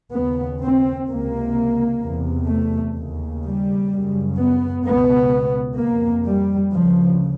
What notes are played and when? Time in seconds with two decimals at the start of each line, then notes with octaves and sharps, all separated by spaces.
0.13 D#2 C#3 B3
0.60 C4
1.07 C#2 C3 A#3
2.02 E2 C3
2.48 A3
2.96 D#2 C#3
3.43 G3
3.90 F#2 C#3
4.37 B3
4.84 C#2 B2 B3
5.79 F2 C3 A#3
6.26 G3
6.73 D2 C#3 F3